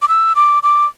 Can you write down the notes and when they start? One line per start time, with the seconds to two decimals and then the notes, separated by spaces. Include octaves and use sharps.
0.02 D6
0.08 E6
0.36 D6
0.63 D6